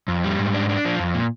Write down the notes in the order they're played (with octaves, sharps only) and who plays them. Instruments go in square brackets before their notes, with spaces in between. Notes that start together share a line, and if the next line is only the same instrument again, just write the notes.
[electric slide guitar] F2
G3
G#2
D4
D4
F3
F2
A#2